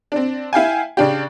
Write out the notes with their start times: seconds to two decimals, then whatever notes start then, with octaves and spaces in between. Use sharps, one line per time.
0.12 C4 D4
0.53 E4 F5 G5 G#5
0.97 C#3 D4 G4